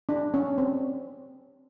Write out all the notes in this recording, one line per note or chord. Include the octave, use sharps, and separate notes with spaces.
D4
C#4
C4